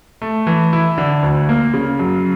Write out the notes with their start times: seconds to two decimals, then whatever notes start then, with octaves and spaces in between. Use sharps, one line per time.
0.22 A3
0.47 E3
0.73 E4
0.98 D3
1.23 D2
1.49 A#3
1.74 C#3
1.99 F#2